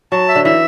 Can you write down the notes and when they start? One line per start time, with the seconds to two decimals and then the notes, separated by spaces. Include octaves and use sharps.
0.12 F#3 A5
0.28 E5
0.35 D3
0.45 E3 E5